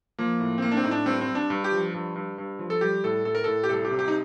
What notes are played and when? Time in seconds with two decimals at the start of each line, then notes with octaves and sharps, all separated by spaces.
0.19 F3 A#3
0.40 A2
0.58 C4
0.62 A2 A#3
0.71 D4
0.77 C4
0.84 A2 D#4
0.91 D4
1.06 G2 C4
1.21 C4
1.28 G2
1.35 D4
1.50 G2
1.64 G4
1.72 F3
1.94 G2
2.16 G2
2.38 G2
2.59 F3
2.70 A4
2.81 G3 G4
3.04 A2 A4
3.25 A2 A4
3.35 A#4
3.44 A2 A4
3.64 G4
3.69 C2 A4
3.85 G4
3.91 C3
3.99 G4
4.08 D#4